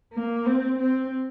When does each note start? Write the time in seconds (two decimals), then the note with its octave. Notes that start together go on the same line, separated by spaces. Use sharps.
0.13 A#3
0.46 C4
0.80 C4